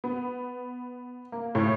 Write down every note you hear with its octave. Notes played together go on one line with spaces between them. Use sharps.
B3
A#3
A2